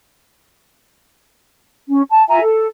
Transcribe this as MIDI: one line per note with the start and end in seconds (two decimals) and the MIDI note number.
1.89 2.02 61
2.10 2.24 81
2.28 2.41 65
2.28 2.41 76
2.28 2.41 80
2.28 2.41 82
2.42 2.66 69